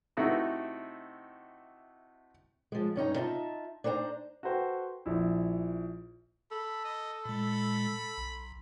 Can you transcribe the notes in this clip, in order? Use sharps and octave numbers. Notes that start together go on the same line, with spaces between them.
C3 A3 D#4 E4 F#4
F3 G#3
G2 C#4 D#4 A#5
D#4 F4 D#5 E5 A5
D4 D#4 C5 G5 A#5
F#4 A4 B4 C5 G5
A#1 E4
A4 B5
D#5
A#2 G#3 B5
B1